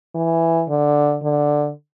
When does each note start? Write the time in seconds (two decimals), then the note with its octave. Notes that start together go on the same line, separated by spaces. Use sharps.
0.15 E3
0.69 D3
1.23 D3